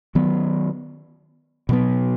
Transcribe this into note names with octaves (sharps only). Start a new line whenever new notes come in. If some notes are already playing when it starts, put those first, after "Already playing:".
D#3 F#3 B3
B2 F#3 B3